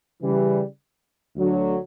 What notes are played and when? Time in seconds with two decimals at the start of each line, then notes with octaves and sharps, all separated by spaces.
0.22 C#3 E3 G3
1.36 D2 D3 F#3